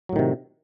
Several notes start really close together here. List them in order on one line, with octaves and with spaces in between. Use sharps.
F#3 A2 D#3 C3